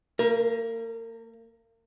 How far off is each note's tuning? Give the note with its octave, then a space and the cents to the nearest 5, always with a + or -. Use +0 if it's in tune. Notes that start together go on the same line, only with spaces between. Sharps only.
A#3 -35 A#4 +25